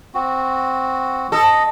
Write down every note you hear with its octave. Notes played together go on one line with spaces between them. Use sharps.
C4 F#4
A4 D#5